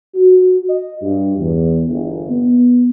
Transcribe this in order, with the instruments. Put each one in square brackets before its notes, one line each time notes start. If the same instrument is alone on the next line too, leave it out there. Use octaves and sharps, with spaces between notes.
[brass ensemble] F#4
D#5
G2
E2
G1
B3